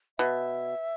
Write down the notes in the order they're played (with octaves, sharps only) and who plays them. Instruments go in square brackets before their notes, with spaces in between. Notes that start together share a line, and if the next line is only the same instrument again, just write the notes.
[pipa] B2 [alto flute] E5